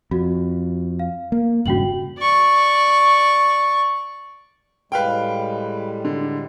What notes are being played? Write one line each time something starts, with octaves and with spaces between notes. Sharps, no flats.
F2 F#4
F5
A#3
E1 G2 C#3 F#4 G5 F#7
D5 C#6
A2 G3 G#3 B4 F5 G5
D3